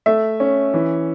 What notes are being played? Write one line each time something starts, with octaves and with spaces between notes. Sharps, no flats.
A3 E5
C#4
E3